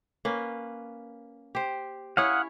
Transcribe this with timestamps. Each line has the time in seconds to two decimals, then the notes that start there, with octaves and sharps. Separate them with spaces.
0.25 A#3 C#4 B4
1.55 G4 C5
2.17 C#4 E4 C#5 F5 F#5 D#6